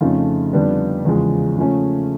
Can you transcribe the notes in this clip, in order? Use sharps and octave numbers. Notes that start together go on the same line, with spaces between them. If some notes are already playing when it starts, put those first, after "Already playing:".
F2 C#3 F3 A3 C#4 D#4 F4
F2 D3 G3 B3 D4
E2 C#3 F3 G#3
C#3 F3 A3 C#4